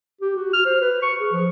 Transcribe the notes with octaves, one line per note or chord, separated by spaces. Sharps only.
G4
F#4
F6
C5
B4
C#6
G#4
F3